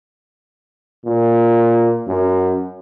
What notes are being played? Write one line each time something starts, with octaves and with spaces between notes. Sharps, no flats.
A#2
F#2